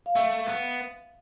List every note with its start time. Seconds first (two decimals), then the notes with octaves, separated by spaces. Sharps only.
0.06 F5
0.15 A3 E5
0.38 F5
0.47 B3